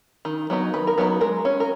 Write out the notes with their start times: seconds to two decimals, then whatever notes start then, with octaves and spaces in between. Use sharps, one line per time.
0.25 D#3
0.50 F#3 B3 D#4
0.74 D#3 B4
0.87 A#4
0.98 F#3 B3 D#4 B4
1.21 G#3 A#4
1.45 C#4
1.60 A#4